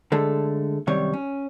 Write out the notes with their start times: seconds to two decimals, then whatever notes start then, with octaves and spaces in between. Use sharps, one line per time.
0.12 D3 G#3 A3 A4
0.87 F#2 C3 D#3 G3 C#5
1.13 C#4